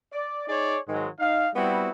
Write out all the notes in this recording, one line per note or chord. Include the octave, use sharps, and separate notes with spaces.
D5
D#4 G#4 C#5 D5
G#2 D#3 F#3 G#3
D#4 F5
G3 B3 C4 E4 F#4